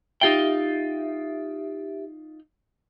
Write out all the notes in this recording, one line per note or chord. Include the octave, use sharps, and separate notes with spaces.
D#4 F4 G4 E5 G5